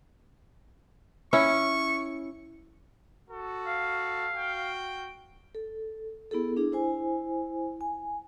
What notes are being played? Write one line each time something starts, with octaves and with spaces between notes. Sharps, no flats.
C#4 E4 C#6
F#4 A4
F5
F#4 G5
A4
B3 E4 G#4 A4
D4 E4 G#4
E4 C5 G#5
G#5